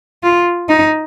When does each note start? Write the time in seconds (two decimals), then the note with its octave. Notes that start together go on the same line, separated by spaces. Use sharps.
0.23 F4
0.69 D#4